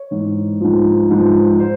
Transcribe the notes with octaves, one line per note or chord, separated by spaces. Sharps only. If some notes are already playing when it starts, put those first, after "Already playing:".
Already playing: C#5
G#2 E3
G#2 F3
G#2 F3
C5